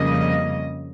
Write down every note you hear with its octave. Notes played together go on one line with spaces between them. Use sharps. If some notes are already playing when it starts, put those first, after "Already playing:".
Already playing: F2 C#3 G3 A#3 C#4 D#5